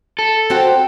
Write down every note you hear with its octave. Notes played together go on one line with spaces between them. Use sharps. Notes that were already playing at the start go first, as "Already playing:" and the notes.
A4
C4 F#4 G4